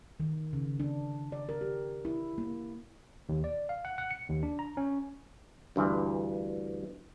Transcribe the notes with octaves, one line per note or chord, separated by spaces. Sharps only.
D#3
C#3
D4
D5
A#4
G4
E4
A#3
D#2
D5
F5
F#5
F#5
C#7
D#2
D4
A#5
C#4
D2 G2 E3